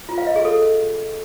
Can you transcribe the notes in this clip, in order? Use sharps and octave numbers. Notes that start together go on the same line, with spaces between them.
F4
F5
D#5
G#4
A4